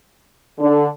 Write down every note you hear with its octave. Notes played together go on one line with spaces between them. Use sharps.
D3